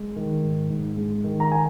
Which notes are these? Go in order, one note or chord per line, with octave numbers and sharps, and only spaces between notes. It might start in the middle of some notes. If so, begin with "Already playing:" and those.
Already playing: G#3
D#3
G#2
G#2
G#3
D#3
A#5
G#5